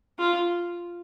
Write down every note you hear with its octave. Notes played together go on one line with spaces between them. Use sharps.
F4